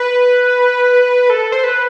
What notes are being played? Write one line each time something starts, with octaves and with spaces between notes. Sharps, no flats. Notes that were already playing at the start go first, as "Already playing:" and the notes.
Already playing: B4
A4
C5
B4